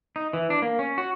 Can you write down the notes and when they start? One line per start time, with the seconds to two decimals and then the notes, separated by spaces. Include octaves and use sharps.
0.16 D#4
0.33 E3
0.50 D4
0.62 A#3
0.79 C#4
0.98 F#4